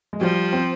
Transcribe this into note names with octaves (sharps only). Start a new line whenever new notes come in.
G#3
F3 G3
C4